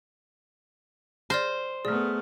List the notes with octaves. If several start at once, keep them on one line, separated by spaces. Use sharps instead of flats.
C5 D5 F6 A#6
A3 B3 G#4 D5 F6